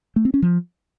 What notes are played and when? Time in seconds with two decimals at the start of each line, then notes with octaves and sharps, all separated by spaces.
0.16 A3
0.25 C4
0.34 C#4
0.42 F3